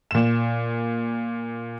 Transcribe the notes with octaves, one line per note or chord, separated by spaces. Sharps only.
A#2 E7